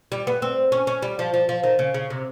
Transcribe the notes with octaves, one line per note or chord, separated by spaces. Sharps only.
G3
B3
C4
C#4
C#4
G3
F3
F3
F3
D#3
C#3
C#3
C3